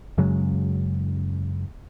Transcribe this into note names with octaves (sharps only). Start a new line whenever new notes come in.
F#2 C#3 F#3 G#3